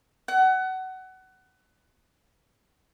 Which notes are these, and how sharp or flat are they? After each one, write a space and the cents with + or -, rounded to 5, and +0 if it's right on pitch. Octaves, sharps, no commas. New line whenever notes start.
F#5 +25